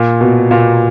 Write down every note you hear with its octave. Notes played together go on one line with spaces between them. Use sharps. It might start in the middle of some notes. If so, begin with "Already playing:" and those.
Already playing: A#2
B2
A#2